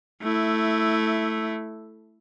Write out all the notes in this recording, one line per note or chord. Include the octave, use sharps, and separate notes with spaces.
A3 E4